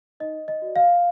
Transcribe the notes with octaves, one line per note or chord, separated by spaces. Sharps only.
D#4 D#5
D#5
F#4 D5
F5